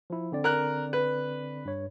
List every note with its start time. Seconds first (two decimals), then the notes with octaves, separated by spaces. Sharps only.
0.10 F3 E4
0.32 D3 C4 D5
0.44 A#4 F#6
0.93 B4
1.65 G2 C#5